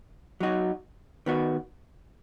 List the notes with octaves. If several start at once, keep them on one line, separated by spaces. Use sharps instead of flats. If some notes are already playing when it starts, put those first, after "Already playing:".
F#3 D#4 F#4
D#3 B3 F#4